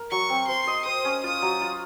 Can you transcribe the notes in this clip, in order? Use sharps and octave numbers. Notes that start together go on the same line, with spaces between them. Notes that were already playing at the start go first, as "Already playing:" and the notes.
Already playing: A#4
F#3 C#6
C4
C5 C6
D#5
C5 D#6
C#4
F4 D#6
F#3
F4